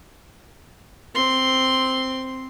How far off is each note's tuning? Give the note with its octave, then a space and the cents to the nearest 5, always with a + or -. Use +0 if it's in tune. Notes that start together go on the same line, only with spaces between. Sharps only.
C4 +0 C6 +0